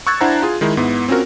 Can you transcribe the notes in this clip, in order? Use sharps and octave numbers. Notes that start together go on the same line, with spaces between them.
C#6 E6 F#6 G#6 A6
D4 E4 C5 F#5 A5 A#5
F4 G#4
D#3 G#3 D#4 E4
G#2 B3 E4
C4 C#4 F4 F#4 A#4